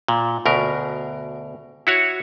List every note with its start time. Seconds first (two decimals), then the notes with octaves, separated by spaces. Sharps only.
0.08 A#2
0.46 D2 B2 A#4
1.87 E4 F#4 C#5